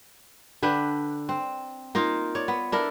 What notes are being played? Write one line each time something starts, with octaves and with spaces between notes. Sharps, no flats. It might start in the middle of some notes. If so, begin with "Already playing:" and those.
D3 D4 B4 G5
C4
A#3 D#4 F4
C#5 D5
B3
D4 E4 A4 A#4